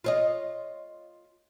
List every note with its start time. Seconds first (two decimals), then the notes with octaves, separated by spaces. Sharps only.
0.04 F4 C#5 D#5